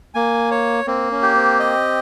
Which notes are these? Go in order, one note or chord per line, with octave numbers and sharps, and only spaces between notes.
A#3 G#5
C#5
A#3 C4
C#4
G4
C4
D#5